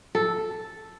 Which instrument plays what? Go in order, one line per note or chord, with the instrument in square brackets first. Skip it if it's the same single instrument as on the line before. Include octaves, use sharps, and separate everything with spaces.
[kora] A4